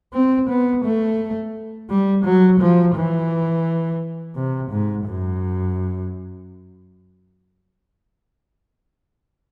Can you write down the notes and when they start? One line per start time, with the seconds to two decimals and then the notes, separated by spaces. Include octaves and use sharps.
0.13 C4
0.49 B3
0.84 A3
1.89 G3
2.25 F#3
2.60 F3
2.95 E3
4.35 C3
4.70 G#2
5.06 F#2